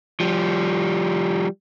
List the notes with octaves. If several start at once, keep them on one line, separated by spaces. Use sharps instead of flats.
F3 G3